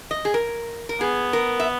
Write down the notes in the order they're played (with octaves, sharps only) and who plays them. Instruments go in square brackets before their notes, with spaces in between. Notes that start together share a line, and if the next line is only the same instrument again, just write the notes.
[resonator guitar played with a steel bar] D#5
G#4
A#4
A#4
[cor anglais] B3 [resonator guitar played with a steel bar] G#4
[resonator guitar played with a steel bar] A#4
E5